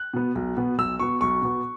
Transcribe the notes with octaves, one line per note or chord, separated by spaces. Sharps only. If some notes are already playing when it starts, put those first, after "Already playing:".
Already playing: F#6
B2 B3
B1
B2 B3
B1 E6
B2 B3 C#6
B1 C#6
B2 B3